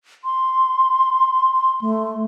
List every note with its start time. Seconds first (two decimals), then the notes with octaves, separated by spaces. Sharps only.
0.24 C6
1.81 A3